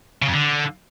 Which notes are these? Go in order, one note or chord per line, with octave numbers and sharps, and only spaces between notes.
C#3
F2
D3